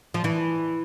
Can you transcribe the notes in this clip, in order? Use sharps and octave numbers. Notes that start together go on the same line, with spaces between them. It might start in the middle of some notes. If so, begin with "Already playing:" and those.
F3
E3